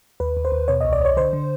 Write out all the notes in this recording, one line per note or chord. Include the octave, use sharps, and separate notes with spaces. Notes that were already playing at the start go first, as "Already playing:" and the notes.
D#2 B4
D#2
C5
D#2
B2 C#5
C2 D#5
D5
C2 C#5
D3 C5
D3